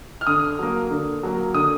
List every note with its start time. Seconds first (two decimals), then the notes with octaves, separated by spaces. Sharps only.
0.21 F6
0.27 D3 D#6
0.59 F#3 A#3
0.91 D3
1.23 F#3 A#3
1.54 D3 D#6